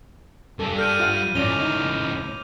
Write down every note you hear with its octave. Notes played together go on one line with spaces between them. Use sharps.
G2 G4 A4
A4 F6 G6 D#7
F4 F5 F#5
C#2 A2 C#4 D5 D6 F7 G7
D#4